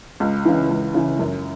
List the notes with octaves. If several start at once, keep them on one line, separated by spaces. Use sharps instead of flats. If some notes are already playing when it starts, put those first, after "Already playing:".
C#2
C#3 E3
C#2
C#3 E3
F#2